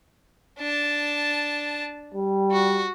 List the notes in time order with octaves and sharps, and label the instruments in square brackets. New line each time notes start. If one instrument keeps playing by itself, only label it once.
[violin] D4 A5
[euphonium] G3
[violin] F#4